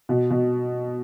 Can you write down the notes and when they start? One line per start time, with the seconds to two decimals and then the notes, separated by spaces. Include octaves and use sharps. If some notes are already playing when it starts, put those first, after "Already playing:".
0.09 B2
0.30 B2